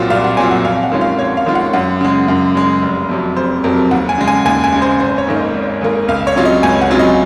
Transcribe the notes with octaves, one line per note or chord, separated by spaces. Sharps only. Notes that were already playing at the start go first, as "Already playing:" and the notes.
Already playing: C2 A#2 F#3 C4 F4 F#5
C2 F5
F#5
A#2 F#3 C4 F4 G#5
F#5
F2 F5
F#5
D#3 G#3 C#4 F4
F5
F2 C#5
F5
D#3 G#3 C#4 F4
F#5
F#2 F#5
C#3 G#3
F#2
C#3 G#3
F1
F2 C3 F#3
F1 C5
F2 C3 F#3 A#4
D#2 F#5
G#5
C#3 G#3
G#5
D#2 G#5
G#5
C#3 G#3
C5
G#1 C5
C#5
G#2 D#3 A#3
D#5
G#1
G#2 D#3 A#3
C#2 F5
C#5
C3 F#3 C#4 F4
D#5
C#2 G#5
F#5
C3 F#3 C#4 F4
D#5